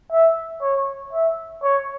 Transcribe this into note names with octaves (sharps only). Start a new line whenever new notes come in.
E5
C#5
E5
C#5